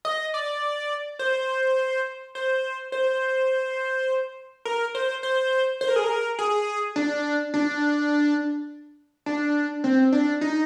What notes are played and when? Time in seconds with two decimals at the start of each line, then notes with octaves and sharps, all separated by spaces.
0.05 D#5
0.34 D5
1.19 C5
2.35 C5
2.92 C5
4.65 A#4
4.95 C5
5.23 C5
5.81 C5
5.88 A#4
5.96 G#4
6.04 A#4
6.39 G#4
6.96 D4
7.54 D4
9.26 D4
9.84 C4
10.12 D4
10.41 D#4